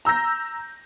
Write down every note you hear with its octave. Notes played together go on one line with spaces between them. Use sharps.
A#5 E6 G6 A#6